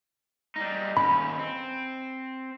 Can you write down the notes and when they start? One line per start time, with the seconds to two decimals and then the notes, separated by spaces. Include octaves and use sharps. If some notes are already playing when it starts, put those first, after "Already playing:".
0.56 G3 D#4
0.97 D#2 C#4 B5
1.39 C4